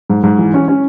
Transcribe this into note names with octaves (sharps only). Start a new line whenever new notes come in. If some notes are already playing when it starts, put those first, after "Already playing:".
G#2
G#2
E3
C#4
C#4